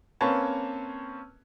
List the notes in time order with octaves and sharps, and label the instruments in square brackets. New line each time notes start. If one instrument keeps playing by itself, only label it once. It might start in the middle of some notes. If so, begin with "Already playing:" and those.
[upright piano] A#3 C4 C#4 B4 C#5 A5